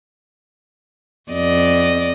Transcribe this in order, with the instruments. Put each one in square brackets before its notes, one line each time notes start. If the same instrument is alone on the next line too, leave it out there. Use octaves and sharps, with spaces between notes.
[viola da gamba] F2 D5 D#5